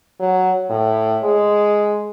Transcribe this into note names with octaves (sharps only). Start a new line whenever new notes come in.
F#3
A2
G#3